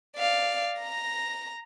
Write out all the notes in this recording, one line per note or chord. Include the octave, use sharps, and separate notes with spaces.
D5 F5
A#5 A#6